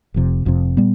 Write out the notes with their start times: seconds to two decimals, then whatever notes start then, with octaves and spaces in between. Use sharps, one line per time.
0.14 F1 F2 C3
0.45 F1 F2 C3
0.77 A#2 G3 B3